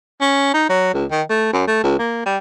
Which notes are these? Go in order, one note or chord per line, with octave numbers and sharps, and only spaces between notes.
C#4
D#4
F#3
C#2
D#3
A3
F#2
A3
C#2
A#3
G3